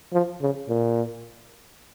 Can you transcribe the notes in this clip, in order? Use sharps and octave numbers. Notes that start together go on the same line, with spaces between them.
F3
C#3
A#2